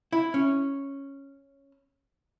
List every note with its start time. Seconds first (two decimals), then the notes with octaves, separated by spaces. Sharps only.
0.12 E4
0.34 C#4